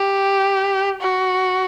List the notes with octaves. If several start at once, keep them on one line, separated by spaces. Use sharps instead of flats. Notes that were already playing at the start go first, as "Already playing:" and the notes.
Already playing: G4
F#4